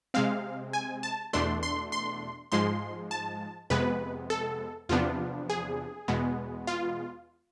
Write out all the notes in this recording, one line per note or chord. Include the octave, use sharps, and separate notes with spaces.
C3 G#3 C4 F5
G#5
A5
E2 B2 A3 D4 C6
C6
C6
G#2 F3 G#3 C6
A5
F2 C3 G#3 B3 B4
A4
E2 C3 F3 B3 D4 F4
G#4
E2 B2 G#3 B3
F4